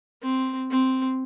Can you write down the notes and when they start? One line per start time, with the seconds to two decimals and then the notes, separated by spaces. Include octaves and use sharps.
0.23 C4
0.71 C4